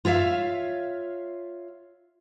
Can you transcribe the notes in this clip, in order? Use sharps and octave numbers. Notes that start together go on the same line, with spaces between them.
F4 C#5 E5 F5